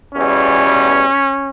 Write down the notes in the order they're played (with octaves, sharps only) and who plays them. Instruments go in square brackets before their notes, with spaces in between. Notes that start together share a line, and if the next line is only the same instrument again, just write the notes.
[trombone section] E2 B2 G3 C#4